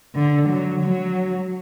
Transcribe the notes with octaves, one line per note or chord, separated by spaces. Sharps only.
D3
F#3
F#3